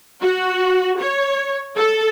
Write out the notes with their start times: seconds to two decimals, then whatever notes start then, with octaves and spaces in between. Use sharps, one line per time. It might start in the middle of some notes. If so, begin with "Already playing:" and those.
0.22 F#4
1.00 C#5
1.77 A4